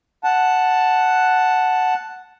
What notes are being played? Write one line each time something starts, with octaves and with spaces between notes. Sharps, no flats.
F#5 A5